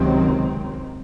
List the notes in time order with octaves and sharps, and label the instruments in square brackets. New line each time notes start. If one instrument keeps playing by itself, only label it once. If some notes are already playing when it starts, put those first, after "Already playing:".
Already playing: [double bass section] C#2 C3 D#3 F#3 C4